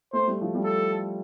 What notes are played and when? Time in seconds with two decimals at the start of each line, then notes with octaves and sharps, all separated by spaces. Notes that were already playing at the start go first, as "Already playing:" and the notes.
0.13 A3 C5
0.27 G3
0.41 F3
0.55 G3
0.64 A4